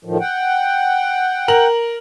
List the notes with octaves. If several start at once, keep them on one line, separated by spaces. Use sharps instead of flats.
A2 D#3 F3
F#5 G5
A#4 F#7